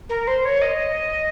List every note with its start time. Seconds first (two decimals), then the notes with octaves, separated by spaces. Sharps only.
0.09 A#4
0.27 C5
0.45 C#5
0.61 D#5